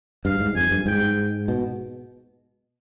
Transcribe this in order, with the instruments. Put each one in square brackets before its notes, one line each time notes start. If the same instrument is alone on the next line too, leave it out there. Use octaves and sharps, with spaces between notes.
[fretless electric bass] G2 [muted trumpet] F5
[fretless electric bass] G#2
[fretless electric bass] F2 [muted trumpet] G#5
[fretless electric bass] G2
[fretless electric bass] G#2 [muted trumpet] G5
[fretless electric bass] B2